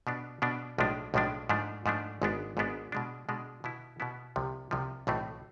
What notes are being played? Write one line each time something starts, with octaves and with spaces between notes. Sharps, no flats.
B2 B3 D4
B2 B3 D4
B1 A2 F3 G#3 D4
B1 A2 F3 G#3 D4
G#2 F3 A3 D4
G#2 F3 A3 D4
G#1 G#2 G#3 B3 D4
G#1 G#2 G#3 B3 D4
B2 G#3 D4
B2 G#3 D4
B2 B3 E4
B2 B3 E4
C2 C3 F3
C2 C3 F3
B1 A2 E3 A3 C4